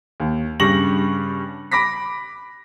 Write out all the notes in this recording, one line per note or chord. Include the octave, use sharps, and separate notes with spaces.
D#2
G2 C#3 G3 C#6 A#6 F#7
B5 D6 A#6 B6